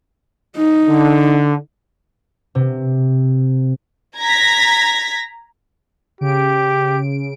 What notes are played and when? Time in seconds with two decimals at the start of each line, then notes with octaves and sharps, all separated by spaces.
0.57 D#4
0.88 D3
2.55 C3
4.19 A#5 G#6 A#6 B6
6.21 C#3 G4 D7